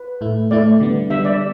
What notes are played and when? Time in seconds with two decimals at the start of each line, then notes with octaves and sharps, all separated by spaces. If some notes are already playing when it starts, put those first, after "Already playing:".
Already playing: B4
0.21 A2 A3 E4
0.51 A2 A3 E4 D5
0.80 D3 G3 B3
1.10 D3 G3 B3 E5
1.25 D5